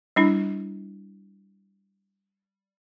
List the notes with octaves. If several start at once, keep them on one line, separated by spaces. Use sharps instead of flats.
G3 D4 E4